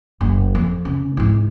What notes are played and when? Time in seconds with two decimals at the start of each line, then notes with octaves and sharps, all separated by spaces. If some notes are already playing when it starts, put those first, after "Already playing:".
0.21 F#1
0.55 F2
0.85 C#3
1.17 G#2 E4